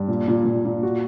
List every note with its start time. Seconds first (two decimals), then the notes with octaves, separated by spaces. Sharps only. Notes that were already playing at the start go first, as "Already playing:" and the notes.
Already playing: G2
0.08 A#2
0.28 A#2
0.45 A#2
0.65 A#2
0.83 F#4